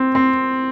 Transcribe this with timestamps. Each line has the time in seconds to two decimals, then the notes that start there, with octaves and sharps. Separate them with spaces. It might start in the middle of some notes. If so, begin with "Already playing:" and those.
Already playing: C4
0.15 C4